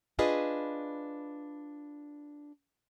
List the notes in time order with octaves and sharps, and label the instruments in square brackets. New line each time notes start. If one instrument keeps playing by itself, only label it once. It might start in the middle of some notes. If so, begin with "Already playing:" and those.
[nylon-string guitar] D4 F4 G#4 B4 D#5